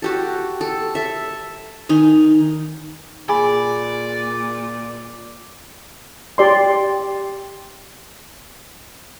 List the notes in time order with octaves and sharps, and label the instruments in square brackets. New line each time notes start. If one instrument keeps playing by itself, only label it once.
[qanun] F#4 G4 A4
A4
A4 E5
D#3 D#4 G#5
[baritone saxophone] A#2 [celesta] G#4 [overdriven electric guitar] D5 [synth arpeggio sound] G#5 B5
[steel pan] G4 D5 C6